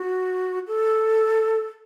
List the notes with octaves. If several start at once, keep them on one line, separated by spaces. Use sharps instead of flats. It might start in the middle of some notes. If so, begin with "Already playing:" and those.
Already playing: F#4
A4